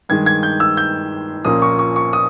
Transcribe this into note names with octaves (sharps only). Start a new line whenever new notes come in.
G2 D#3 G#3 G#6
G#6
G6
E6
G6
A#1 A#2 A#3 C#4 D#6
C#6
C#6
C#6
D#6